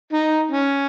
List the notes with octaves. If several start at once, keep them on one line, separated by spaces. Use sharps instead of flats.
D#4
C#4